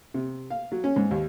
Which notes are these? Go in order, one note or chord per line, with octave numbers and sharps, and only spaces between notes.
C3
F5
F#3
C#4
G#2
D#2